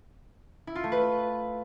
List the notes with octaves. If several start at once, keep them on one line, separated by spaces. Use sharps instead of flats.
E4
F4
A3
B4